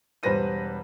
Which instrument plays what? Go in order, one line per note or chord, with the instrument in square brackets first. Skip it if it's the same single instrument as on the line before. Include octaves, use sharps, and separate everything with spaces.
[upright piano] E1 G3 B4 C5 A#6 D#7